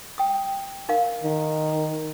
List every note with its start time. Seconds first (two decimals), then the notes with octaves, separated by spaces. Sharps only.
0.18 G5 D#6
0.89 D#4 A#4 F5
1.24 D#3